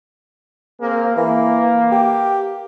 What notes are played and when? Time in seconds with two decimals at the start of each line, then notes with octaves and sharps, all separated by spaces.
0.80 A#3 C4 G#4
1.16 E3 A#3
1.92 G4